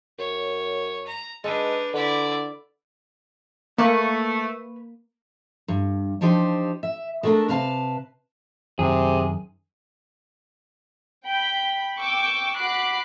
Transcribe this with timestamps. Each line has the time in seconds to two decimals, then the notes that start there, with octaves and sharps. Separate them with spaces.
0.19 F#2 C#5
1.07 A#5
1.44 G#3 D4 D#4 A4 B4
1.94 D3 E4 D5
3.78 A3 A#3 B4 C#6
5.68 G2
6.21 F3 D4 D#4 G4 C5
6.83 E5
7.23 G#3 A3 B3 D4 A4 A#4
7.48 C3 B4 F5 A5
8.79 F#2 C3 D#3 G#4
11.26 G5 B5
11.99 G5 C#6 D6 E6
12.57 F#4 B5 D6 F#6 C7